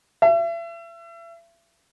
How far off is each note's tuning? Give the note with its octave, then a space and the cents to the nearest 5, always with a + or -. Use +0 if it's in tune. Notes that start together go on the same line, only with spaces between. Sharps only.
E5 +35